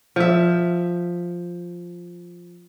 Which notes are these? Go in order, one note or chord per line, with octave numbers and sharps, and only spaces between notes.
F3 E5